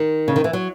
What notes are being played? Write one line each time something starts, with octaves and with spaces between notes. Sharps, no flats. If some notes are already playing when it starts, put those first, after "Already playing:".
Already playing: D#3
C#3
D#3
E3
F#3